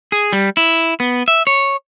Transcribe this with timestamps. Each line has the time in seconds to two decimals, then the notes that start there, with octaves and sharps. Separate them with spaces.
0.12 G#4
0.33 G3
0.57 E4
1.00 B3
1.28 E5
1.47 C#5